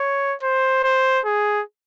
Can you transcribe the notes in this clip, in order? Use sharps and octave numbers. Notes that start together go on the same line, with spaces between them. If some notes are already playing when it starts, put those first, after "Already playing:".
Already playing: C#5
C5
C5
G#4